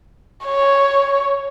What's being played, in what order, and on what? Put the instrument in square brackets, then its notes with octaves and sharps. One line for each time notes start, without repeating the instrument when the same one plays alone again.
[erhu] C#5